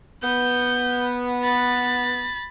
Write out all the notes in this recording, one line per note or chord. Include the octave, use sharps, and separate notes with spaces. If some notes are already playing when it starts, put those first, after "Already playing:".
B3 G6
B5 A6